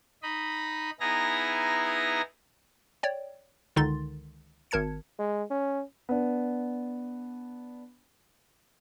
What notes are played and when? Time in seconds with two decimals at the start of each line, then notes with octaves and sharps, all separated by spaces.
0.23 D#4 D#5 B5
1.00 B3 D#4 E4 G#4 A#5 A#6
3.03 C#5 D5 G5
3.76 C#2 D3 D#3 D#4 C6 A6
4.71 G#1 A#4 A5 G#6 C#7
5.19 G#3
5.51 C#4
6.09 B3 D4